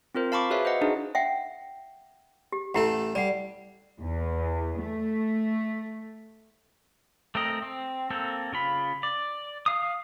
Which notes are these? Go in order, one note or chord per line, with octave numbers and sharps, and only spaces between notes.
C4 F4 A#4 C5
F5 A5 B5 C#6 D6
F#4 G#4 B4 C#5 E5 F5
C5 D#5 F#5
D4 D#4 F#4 G#4
E5 F#5 G5
G4
A1 A3 E4 G4 A4 F#5
G3 D5 F#5
E2
A3
A3 C4 A#4 D#5
C4
A#3 C4 A4
C#3 F4 B5
D5
F5 D#6